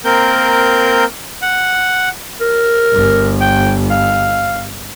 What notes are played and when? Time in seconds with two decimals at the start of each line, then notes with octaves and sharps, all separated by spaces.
0.05 A#3 C4 A#4 G6
1.42 F#5
2.41 A#4
2.93 G1
3.41 G5
3.90 F5